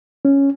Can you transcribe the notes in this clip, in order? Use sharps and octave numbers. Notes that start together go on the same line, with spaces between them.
C#4